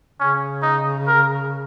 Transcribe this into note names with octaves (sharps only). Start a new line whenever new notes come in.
C#3 C#4
D#4
A#4